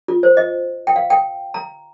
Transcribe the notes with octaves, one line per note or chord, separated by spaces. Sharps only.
F4
C5
D#5
G5
F5
G5
A#5